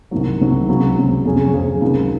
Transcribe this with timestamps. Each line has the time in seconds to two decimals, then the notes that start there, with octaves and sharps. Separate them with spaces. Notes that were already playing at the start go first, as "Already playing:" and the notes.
0.11 C2 C3 D#3 F#3
0.41 C2 C3 D#3 F#3
0.68 C#2 C3 F#3
0.97 C#2 C3 F#3
1.25 F2 C3 F#3 C#4 G#4
1.54 F2 C3 F#3 C#4 G#4
1.81 C#2 C3 D#3 F#3